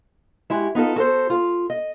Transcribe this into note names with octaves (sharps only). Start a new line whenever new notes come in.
G#3 E4 F#4 G4
B3 D#4 F4 A4
F#4 A4 C5
F4
D#5